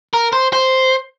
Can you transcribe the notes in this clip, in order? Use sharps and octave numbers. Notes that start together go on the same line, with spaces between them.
A#4
C5
C5